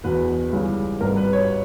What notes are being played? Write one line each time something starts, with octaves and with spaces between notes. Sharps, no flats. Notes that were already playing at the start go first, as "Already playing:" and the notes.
E1 E2 B2 B4
C#2 C#3 E3 G3
G#1 G2 G3 A#4
B4
C#5